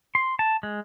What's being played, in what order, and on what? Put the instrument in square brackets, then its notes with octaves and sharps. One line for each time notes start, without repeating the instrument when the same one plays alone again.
[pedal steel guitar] C6
A5
G#3